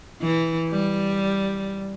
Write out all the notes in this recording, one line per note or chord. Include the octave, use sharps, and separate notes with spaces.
E3
G3